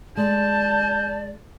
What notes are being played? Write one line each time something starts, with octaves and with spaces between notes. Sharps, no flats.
G#3 D5 A5 G6